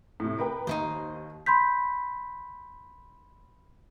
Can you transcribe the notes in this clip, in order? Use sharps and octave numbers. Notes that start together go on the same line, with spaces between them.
A2 C3
A#4 B4 G5
D#2 D#4 E4 C5
B5 C6 G6 B6